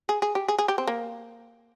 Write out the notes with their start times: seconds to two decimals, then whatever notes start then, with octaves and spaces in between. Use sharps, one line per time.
0.09 G#4
0.22 G#4
0.35 G4
0.48 G#4
0.58 G#4
0.68 G4
0.78 C4
0.87 A#3